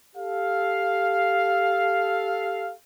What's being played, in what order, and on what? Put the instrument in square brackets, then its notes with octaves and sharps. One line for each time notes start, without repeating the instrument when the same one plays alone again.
[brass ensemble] G4 A4 F5